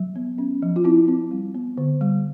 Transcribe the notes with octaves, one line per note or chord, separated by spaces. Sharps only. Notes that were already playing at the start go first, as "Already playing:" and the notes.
Already playing: F#3
B3
C#4
F3
F4
C4 E4
C4
G3
B3
D3
G3